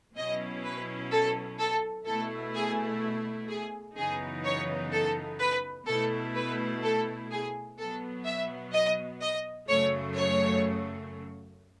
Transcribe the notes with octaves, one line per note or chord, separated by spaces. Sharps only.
B2 F#3 C#4 E4 D#5
B4
A4
A4
B2 A3 E4 A4
G#4
G#4
F#2 C#3 E3 B3 D#4 G#4
C#5
A4
B4
B2 A3 E4 A4
B4
A4
G#4
B2 F#3 B3 A4
E5
D#5
D#5
F#2 C#3 F#3 A3 C#5
C#5